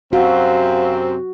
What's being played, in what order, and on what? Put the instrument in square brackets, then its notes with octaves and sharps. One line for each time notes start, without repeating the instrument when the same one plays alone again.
[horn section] F#2 C3 C4 [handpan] F#4 [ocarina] F5